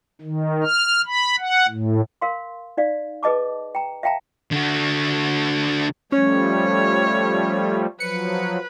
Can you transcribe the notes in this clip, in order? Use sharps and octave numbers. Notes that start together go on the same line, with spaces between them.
D#3
F6
B5
F#5
A2
A#4 F5 C6
D#4 D5 F5
G#4 B4 D#5 A5 D6
G5 A#5
E5 F5 G5 A5 A#5
D3 F#4
F3 G3 A3 C#4 C#5
F3 F#3 B4 C#7